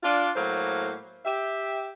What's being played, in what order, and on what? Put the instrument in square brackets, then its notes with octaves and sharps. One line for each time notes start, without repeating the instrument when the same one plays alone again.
[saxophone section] D4 F4
A2 F#3 A#3 C5 F5
G4 E5